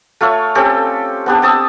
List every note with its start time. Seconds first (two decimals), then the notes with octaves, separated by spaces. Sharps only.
0.21 A3 F4 A4 C#5
0.55 C4 C#4 G4 A4
1.26 B3 D4 G4
1.42 C4 A5 D#6 E6